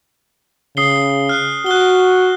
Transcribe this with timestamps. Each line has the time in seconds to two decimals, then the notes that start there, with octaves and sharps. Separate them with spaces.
0.77 C#3 D#6 C7 G7
1.29 F6 F#6 C7
1.66 F#4 F#6 G7